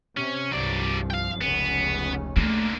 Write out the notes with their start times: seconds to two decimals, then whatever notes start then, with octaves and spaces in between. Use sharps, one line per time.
0.17 C3 C#4
0.52 C2 G2 F3 F#3 D5
1.10 F5 G5
1.41 F1 C#2 B3 C#4
2.37 D3 A3 A#3